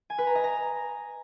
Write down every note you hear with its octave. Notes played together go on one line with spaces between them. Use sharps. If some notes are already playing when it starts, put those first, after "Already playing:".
G#5
B4
A#5
D#5
A#5